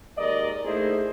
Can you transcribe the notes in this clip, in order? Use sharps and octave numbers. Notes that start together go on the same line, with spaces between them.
D#2 G#3 A#4 D5 D#5
A3 A#3 D#4 E4 G#4 C5